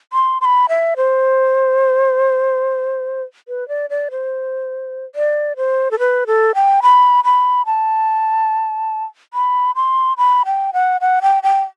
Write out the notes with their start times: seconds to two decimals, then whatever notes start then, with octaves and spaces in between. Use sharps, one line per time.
0.13 C6
0.41 C6
0.45 B5
0.69 E5
0.97 C5
3.48 B4
3.68 D5
3.90 D5
4.11 C5
5.15 D5
5.57 C5
5.91 A4
5.99 B4
6.27 A4
6.55 G5
6.83 B5
7.24 B5
7.66 A5
9.34 B5
9.76 C6
10.18 B5
10.46 G5
10.73 F#5
11.01 F#5
11.22 G5
11.43 G5